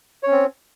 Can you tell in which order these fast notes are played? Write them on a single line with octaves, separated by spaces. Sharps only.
C#5 C#4 C4